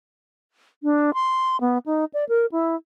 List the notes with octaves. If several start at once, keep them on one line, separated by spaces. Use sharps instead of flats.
D4
C6
B3
D#4
D5
A#4
E4